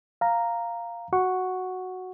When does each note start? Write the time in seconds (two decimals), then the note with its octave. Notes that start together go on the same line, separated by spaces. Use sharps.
0.21 F5 A#5
1.13 F#4 F#5 C#6